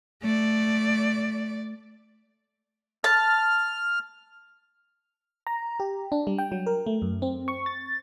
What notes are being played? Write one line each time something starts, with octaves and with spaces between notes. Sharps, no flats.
A3 D5
A5 F6
A#5
G4
D4
G3
G5
F#3
A#4
A3
F#2
C4
C#6
A6